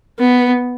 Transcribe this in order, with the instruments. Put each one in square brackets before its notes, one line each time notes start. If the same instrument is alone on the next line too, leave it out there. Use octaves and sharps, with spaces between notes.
[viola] B3